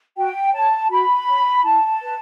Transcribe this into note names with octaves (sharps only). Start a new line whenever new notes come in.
F#4 G5
C#5 A5
F#4 B5
C#5
E4 A5
B4